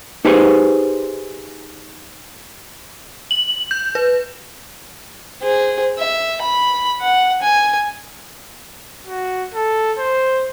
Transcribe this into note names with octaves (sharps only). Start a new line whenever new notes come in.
D#4 G4 G#4 B4 C5
F#7
G6
B4
G#4 C5
E5
B5
F#5
G#5
F#4
A4
C5